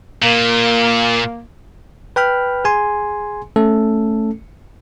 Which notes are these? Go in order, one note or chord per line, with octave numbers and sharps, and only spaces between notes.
A#2 A#3
B4 G5 B5 F6
G#4 G#5 C6
A3 C#4 A4